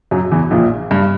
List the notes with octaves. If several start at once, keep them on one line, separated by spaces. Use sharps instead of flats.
F#2 F#3
E2 E3
A#1 A#2
G2